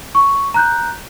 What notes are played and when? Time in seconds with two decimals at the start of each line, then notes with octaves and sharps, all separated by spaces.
0.15 C#6
0.54 A#5 F#6 G6